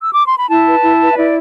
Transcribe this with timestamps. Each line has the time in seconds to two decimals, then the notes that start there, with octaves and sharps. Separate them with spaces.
0.02 E6
0.14 D6
0.26 C6
0.38 B5
0.50 E4 A5
0.67 B4
0.84 E4
1.00 B4
1.12 E5
1.17 E4 D5